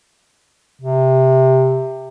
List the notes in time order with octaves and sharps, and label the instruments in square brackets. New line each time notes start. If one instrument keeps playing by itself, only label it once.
[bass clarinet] C3